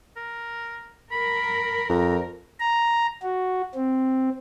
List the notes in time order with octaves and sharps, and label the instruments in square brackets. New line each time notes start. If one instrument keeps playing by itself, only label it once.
[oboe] A#4
[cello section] A#4 [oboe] B5
[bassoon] F2 [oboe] A#5
[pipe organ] A#5
F#4
C4